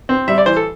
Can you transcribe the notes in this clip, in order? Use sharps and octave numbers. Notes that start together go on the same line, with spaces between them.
C4
G3 E5
D5
E3 C5
A4